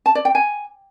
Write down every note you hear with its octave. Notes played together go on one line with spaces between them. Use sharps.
A5
D5
G5
G#5